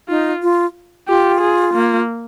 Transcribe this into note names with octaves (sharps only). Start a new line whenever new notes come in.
D#4 F4
F4
F4 G4
G#4
A#3